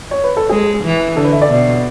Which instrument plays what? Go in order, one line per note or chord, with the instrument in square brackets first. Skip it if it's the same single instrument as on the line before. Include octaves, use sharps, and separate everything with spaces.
[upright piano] C#5
B4
A4
[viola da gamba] G#3 [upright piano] G#4
[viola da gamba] E3
[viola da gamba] D3 [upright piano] A4
[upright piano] B4
E5
D5
[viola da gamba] B2